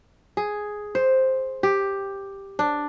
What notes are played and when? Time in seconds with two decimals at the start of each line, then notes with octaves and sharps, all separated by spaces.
0.37 G#4
0.95 C5
1.63 G4
2.59 D4